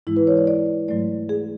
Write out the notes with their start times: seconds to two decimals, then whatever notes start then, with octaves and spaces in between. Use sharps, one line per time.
0.07 G#2 E3 G#3 E4
0.17 B4
0.27 C#5
0.37 D5
0.47 D5
0.88 G#2 F#3 A3 D5
1.29 G#4